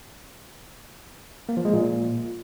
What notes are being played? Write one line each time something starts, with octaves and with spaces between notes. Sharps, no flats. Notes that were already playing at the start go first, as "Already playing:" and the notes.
A#3
F3
G#3
A#2